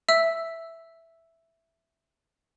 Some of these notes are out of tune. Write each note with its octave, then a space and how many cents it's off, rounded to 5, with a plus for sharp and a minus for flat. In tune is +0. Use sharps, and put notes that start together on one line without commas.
E5 +0 E6 +0